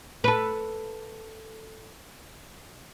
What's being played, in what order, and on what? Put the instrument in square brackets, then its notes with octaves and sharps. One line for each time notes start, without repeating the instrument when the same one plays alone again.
[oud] A4 B4